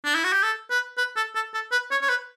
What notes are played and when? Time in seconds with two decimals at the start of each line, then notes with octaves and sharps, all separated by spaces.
0.05 D4
0.15 E4
0.24 F#4
0.33 G4
0.43 A4
0.70 B4
0.98 B4
1.16 A4
1.35 A4
1.54 A4
1.72 B4
1.91 C#5
2.01 C#5
2.09 B4